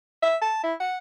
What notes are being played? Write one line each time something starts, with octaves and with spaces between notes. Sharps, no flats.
E5
A5
E4
F#5